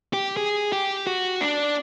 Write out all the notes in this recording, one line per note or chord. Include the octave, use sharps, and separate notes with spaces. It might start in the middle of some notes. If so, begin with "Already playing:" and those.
G4
G#4
G4
F#4
D4